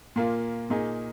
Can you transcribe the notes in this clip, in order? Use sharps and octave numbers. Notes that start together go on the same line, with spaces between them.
A#2 A#3 F4
A#2 A#3 D#4 G#4